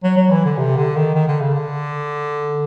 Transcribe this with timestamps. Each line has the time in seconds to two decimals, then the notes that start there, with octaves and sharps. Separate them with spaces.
0.03 F#3
0.17 F#3
0.30 E3
0.45 D3
0.58 C3
0.77 D3
0.96 D#3
1.14 D#3
1.28 D3
1.41 C#3
1.53 D3